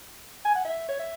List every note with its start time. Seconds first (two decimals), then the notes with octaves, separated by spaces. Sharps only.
0.45 G#5
0.55 F#5
0.64 E5
0.88 C#5
0.99 E5